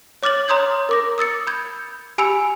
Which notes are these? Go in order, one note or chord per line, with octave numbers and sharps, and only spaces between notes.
C#5 D6 F6 A6 F#7
C#5 A#5 C6 D#6 G6 G#6
A#4 D6 A#6
D#6 E6 A6 C#7
B5 G6 G#6
G4 G#5 B5 E6 C#7 F7